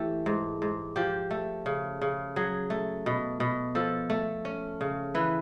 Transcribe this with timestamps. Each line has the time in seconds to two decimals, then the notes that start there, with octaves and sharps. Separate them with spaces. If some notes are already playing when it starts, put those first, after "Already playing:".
Already playing: E3 A3 G4
0.26 G#2
0.62 G#2
0.96 F3 G4
1.31 A3
1.66 C#3
2.01 C#3
2.36 F#3 G#4
2.70 A3
3.06 B2
3.40 B2
3.75 F3 A4
4.10 A3
4.45 C#4
4.81 C#3
5.14 E3 B4